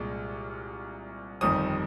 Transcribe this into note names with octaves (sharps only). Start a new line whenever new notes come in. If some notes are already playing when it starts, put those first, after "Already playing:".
Already playing: C2 A#2 G#3
G1 F2 D#3 G3 D#6